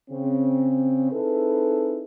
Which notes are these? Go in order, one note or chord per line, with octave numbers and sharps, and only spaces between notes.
C#3 C4
C4 D#4 E4 G#4 A4 B4